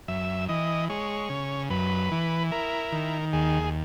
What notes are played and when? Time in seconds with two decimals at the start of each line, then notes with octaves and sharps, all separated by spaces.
0.08 F#2 E5
0.49 E3 D#5
0.90 G#3 C#5
1.30 C#3
1.70 F#2 B4
2.12 E3
2.51 E4 A#4
2.92 D#3
3.33 D#2 G#4